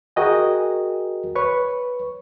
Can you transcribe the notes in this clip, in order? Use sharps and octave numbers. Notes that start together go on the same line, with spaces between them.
F#4 G#4 A#4 D#5 G5 G#5
B4 C#5 C#6